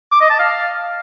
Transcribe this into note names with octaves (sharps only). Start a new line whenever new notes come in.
D6
D#5
A5
F5